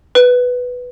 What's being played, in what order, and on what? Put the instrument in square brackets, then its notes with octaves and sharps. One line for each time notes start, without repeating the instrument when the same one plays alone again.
[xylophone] B4